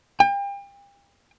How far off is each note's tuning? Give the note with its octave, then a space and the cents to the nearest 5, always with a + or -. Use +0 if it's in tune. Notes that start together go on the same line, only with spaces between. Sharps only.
G5 +35